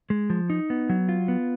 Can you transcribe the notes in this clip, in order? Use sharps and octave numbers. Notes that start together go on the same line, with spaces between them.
G#3
F3
D#4
B3
F#3
F4
B3